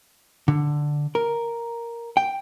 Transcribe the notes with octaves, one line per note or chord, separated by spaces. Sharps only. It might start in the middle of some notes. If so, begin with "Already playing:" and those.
D3
A#4
G5